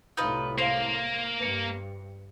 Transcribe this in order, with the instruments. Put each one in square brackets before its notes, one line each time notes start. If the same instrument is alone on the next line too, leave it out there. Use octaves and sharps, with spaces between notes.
[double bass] C2 A2 [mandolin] D#4 F4 B4 [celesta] G6
[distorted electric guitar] A#3 [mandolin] C5 [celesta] F5 C7
[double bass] G2 [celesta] B4 C#7